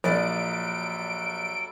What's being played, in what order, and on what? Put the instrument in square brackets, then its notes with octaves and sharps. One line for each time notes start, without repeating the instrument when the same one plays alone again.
[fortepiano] A#1 [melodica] F#3 G3 A4 [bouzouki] D5 D#5 [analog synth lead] D7